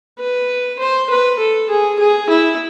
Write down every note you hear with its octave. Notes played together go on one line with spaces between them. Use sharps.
B4
C5
B4
A4
G#4
G#4
E4